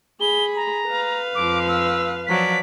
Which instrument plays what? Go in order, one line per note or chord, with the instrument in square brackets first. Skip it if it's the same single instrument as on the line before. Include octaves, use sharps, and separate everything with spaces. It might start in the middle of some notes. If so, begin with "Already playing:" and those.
[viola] G#4 B5 [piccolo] G7
[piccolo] A#5
[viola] B4 F5
[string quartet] F2 F3 [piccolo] D6
[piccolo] E6
[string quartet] F3 F#3 D5 [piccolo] B6